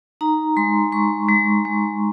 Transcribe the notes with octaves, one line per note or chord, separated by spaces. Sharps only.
D#4 A#5
G#3 C6
G#3 C#6
G#3
G#3